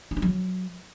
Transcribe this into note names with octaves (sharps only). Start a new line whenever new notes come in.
E4
D#4
F#3